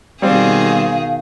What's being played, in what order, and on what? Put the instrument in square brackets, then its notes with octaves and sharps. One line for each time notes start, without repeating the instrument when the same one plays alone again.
[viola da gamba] B2 D#3 G#4 [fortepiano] G3 C4 [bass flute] F5